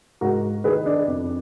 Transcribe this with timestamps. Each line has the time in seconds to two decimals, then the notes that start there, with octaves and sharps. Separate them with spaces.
0.21 G#2 F#4 A#4
0.64 D#3 G#4 B4
0.86 D4
1.07 F2